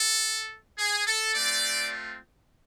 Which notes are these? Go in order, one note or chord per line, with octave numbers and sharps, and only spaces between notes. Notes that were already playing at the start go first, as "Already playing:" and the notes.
Already playing: A4
G#4
A4
A3 C4 F4 D5